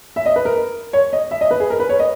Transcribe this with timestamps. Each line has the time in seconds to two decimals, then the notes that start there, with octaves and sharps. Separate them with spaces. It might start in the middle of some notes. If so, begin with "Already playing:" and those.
0.16 E5
0.26 D#5
0.36 B4
0.45 A#4
0.93 C#5
1.13 D#5
1.31 E5
1.41 D#5
1.51 B4
1.60 G#4
1.70 A#4
1.80 B4
1.89 C#5
1.99 D#5